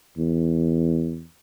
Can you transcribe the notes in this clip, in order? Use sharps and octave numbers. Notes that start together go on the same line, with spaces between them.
E2